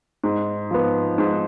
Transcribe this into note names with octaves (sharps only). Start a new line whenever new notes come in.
G#2
F3 B3
G#2